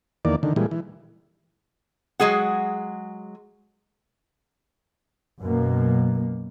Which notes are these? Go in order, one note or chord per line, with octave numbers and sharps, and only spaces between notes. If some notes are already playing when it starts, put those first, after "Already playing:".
E2 D#3 A#3 D5
D3 D#3
A#2 E3 G3 G#3
E3
F#3 G#3 G#4 F#5
F#2 B2 A#3